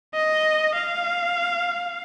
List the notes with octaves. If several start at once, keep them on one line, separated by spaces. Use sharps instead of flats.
D#5
F5